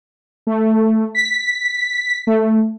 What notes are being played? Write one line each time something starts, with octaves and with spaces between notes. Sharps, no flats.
A3
B6
A3